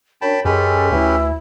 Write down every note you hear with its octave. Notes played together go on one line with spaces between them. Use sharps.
F#2 D4 G5 A5 B5
F#2 G#3 C#4 G4 A4 B4
D2 E3 E4